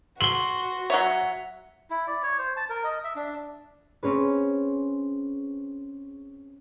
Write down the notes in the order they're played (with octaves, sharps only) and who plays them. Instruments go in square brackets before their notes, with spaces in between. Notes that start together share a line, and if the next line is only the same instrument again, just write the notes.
[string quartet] F#4 [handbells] C6 [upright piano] F#7 G7
[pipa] F#3 C#5 [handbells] E5 F#5
[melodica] E4
D5
C#5
C5
A5
A#4
D#5
E5
D4
[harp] C4 C#4 G#4 B4